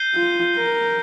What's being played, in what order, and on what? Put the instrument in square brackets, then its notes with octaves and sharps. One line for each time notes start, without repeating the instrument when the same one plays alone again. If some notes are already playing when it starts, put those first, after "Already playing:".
Already playing: [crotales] G6 C7 D#7 G7
[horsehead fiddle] F4
A#4